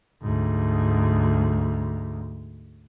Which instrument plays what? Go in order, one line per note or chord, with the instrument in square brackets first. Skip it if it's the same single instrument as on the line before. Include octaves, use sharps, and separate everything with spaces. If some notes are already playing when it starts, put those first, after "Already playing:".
[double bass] D2 G#2